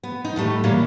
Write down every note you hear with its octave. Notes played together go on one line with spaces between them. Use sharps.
B3
D#4
A2 G3 A3
A#2 E3 F#3 G3 A#3